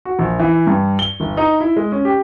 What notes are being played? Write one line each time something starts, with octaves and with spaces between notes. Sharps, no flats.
F#4
A#1
E3
G2
G7
G1
D#4
E4
G#3
C#4
G4